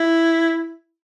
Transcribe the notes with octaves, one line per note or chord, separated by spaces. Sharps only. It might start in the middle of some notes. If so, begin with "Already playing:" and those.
Already playing: E4